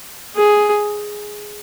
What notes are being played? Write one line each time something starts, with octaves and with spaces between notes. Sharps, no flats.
G#4